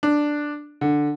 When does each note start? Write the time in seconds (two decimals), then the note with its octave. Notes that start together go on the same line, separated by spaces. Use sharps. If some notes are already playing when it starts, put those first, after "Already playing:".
0.03 D4
0.81 D3